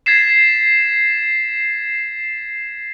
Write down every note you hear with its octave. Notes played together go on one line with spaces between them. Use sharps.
G#6 A6 B6 C7 E7